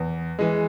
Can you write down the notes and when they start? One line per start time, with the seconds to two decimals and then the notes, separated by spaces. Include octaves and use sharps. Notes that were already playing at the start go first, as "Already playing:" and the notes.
Already playing: E2
0.39 E3 G#3